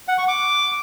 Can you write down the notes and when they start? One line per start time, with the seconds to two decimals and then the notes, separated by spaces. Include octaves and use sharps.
0.08 F#5
0.18 C#6
0.28 D6